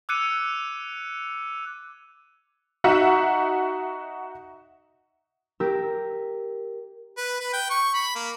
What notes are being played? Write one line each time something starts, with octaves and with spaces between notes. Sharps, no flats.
D6 E6 F#6 G#6 C#7 D#7
D#4 F#4 E5 F#5
G4 A#4 E6
B4
B4
G5
C#6
B5
A#3